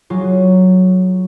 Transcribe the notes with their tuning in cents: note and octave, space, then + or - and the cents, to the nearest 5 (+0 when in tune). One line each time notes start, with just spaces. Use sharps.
F#3 +0 F4 +0 G#4 +0